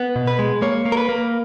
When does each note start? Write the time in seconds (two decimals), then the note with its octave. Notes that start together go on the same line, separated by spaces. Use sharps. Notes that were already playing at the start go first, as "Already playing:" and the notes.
Already playing: B3
0.16 B2
0.27 B4
0.39 G#3
0.62 A#3 C#5
0.86 A#3
0.92 A#4
0.97 B4
1.09 A#3